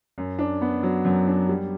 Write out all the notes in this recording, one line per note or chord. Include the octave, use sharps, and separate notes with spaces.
F#2
D4
B3
F#3
F#2
D4
G3